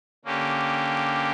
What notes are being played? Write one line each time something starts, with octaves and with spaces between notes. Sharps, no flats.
D3 A#3 C#4 G4